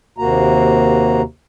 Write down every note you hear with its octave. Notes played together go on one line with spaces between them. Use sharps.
D#2 C3 A#3 F#4 A#5